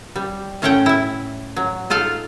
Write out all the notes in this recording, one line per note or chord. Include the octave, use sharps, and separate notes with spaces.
G3
A2 C#4 A4 C#5 F#5 G5
E4 E5
F#3
D#4 F4 A4 F5